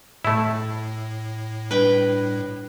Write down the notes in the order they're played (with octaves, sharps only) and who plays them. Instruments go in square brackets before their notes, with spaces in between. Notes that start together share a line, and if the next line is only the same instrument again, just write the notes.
[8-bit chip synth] A2 [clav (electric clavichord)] A3 E4
[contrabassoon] G2 [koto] B4 G5